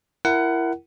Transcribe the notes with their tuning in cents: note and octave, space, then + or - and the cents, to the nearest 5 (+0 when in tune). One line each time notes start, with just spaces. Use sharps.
E4 +25 A#4 +0 F#5 +20